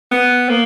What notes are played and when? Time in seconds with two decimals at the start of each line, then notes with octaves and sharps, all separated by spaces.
0.11 B3
0.49 A#3